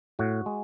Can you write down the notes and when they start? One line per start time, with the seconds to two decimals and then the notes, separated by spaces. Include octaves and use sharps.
0.19 A2 F#4
0.46 G#3